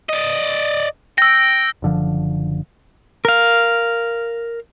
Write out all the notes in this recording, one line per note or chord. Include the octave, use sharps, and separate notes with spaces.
D5 D#5
G5 E6 A#6
F#1 D3 F3
A#4 F5